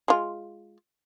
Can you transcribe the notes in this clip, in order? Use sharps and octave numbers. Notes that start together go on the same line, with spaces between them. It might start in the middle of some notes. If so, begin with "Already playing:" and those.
G#3 F4